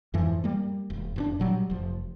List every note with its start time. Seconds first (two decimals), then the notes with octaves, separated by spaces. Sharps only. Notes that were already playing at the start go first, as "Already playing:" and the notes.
0.14 F2 G#2 E3 F3
0.44 G3 A#3
0.90 E1
1.16 F1 B2 D4
1.40 A#2 F#3 G3
1.70 F1 F3